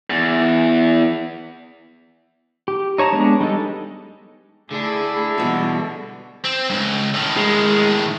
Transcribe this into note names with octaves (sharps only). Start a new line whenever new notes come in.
E2
G4
D#4 C#5 A5 A#5
G#3 B3 D4
G3 G#3 D#4 A4
D3 A3 D4 E4 G#4
B2 E3 G3 G#3 F#4
C4
C#2 G2
A2 D#3
G#3